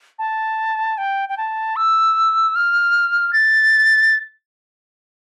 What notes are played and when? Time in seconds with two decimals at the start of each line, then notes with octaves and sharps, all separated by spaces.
0.19 A5
0.98 G5
1.29 G5
1.38 A5
1.76 E6
2.56 F6
3.33 A6